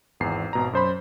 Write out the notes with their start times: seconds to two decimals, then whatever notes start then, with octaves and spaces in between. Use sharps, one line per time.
0.20 G#1 E2 C7
0.53 G#1 B2 A#5
0.73 F#2 C5 B5